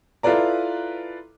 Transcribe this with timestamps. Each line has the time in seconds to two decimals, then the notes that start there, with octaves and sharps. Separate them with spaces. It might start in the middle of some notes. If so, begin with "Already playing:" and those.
0.23 E4 F4 A4 B4 D5 A#5